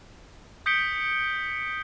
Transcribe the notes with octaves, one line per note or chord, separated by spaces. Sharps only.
D#6 G6 B6 C#7 D7 G7